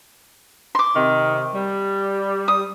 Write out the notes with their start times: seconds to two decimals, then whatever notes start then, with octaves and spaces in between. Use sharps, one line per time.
0.75 C6 D6
0.95 C3 D#3
1.54 G3
2.48 D#6